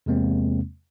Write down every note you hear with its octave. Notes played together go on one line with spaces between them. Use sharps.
E2 C3 G#3 A#3 C4